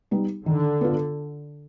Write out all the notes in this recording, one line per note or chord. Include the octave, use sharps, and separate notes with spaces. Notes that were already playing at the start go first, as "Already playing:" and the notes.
G3 B3 D#4
D3 D#3
B3 D4 F4